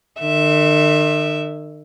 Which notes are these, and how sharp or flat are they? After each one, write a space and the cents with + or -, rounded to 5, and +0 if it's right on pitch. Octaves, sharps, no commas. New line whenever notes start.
D#3 -45 E5 +0